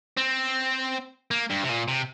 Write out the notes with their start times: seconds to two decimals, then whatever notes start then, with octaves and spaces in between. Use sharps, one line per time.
0.17 C4
1.31 A#3
1.50 G2
1.64 C3
1.70 A#2
1.88 C3